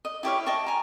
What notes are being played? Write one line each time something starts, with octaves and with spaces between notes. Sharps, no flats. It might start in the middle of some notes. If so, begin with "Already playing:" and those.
D#5
E4 G4 C#5 F5
D#5 G5 A5 C#6
G#5 A#5